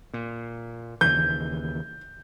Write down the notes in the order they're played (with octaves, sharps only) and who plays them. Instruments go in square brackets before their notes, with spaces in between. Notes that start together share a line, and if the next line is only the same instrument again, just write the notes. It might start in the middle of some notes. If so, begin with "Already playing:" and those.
[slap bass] A#2
[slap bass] D#2 C#3 E3 [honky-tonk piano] G6